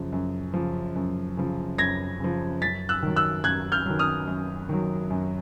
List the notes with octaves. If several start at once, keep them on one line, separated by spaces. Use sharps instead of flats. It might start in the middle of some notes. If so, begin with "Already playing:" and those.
Already playing: F#2 C#3 F3
F#2
C#3 F3
F#2
C#3 F3
F#2 G#6 A#6
C#3 F3
F#2 A6 B6
E6 F#6
D#3 F#3
E6 F#6
F#2 F#6 G#6
F6 G6
D#3 F#3
D#6 F6
F#2
D#3 F#3
F#2